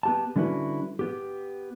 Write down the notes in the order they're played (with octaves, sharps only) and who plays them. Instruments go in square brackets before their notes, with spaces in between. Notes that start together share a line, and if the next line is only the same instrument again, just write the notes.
[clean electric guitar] B3 G4 A5
D3 G3 C#4 E4 F#4 B4
B3 G4